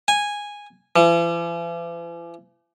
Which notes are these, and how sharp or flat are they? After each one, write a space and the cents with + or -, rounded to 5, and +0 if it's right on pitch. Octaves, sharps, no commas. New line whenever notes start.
G#5 -10
E3 +45